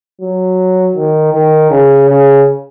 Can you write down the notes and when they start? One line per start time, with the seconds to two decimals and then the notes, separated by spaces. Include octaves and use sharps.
0.21 F#3
0.96 D#3
1.33 D#3
1.71 C#3
2.09 C#3